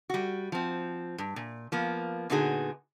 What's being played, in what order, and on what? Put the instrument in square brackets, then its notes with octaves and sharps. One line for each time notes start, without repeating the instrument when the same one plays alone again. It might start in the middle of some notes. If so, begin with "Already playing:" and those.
[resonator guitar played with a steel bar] G3 F#4
F3 C4
G2
A#2
F3 A#3 B3
A#2 D3 B3 D#4 F#4 G#4